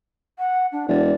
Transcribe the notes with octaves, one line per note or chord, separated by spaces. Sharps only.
F#5
D4
E1 D5